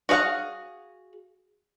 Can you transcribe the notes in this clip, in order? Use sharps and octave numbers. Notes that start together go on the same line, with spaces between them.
F#4 G#4 C#5 F5 F#5